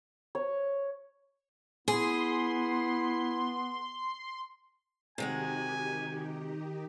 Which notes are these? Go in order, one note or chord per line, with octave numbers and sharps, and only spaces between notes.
C#5
B3 E4 G#4 C6
C3 D#3 G#3 D#4 F#4 G4 G#5